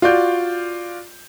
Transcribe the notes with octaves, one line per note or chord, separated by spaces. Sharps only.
F4 F#4 D5 G6